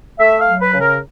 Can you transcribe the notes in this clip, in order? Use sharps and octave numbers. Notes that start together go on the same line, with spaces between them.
A3 E5
F5
F#3
B4
C#3
A#4